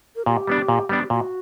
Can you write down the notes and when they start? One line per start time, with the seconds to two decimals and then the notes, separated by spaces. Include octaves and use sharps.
0.16 A#4
0.26 A#2 G4
0.47 G3 B3 D4
0.68 A#2
0.89 G3 B3 D4
1.04 G4
1.10 A#2 F#4